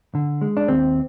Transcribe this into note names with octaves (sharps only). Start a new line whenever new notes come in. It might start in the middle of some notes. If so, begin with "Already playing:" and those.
D3
G#3
D4
D#2 C4